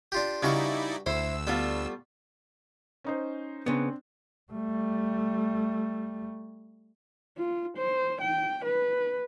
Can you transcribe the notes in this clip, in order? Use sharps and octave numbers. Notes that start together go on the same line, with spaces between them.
D4 F4 G4
G2 C#3 D#4 E4 F#4 D5 C#6
D2 E4 C5 E6
G3 A3 B3 F4
C#4 D#4 C5
C#3 B3 C4 D4
G3 A3
F4
C5
G5
B4